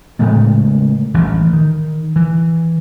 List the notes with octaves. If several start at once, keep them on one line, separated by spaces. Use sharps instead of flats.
A2 C#3 G#3 A3
A1 G2 E3
D#3
E3